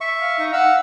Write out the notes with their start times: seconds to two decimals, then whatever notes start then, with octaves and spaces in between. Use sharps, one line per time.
0.01 E5 C#6
0.19 F5
0.39 D#4
0.53 F5 F#5 E6